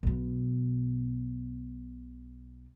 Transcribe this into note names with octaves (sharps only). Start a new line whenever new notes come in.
B1 B2